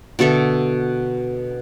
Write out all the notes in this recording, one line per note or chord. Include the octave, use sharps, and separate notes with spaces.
B2 D3 A4 E5